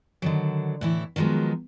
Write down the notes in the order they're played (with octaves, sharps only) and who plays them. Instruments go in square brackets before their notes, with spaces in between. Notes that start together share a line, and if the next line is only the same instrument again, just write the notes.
[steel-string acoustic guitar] D3 D#3 F#3
A2 E3 E4
D#3 F3 F#3 G#3 B3